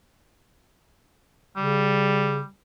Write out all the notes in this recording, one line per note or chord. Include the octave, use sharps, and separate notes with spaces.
C#3 G3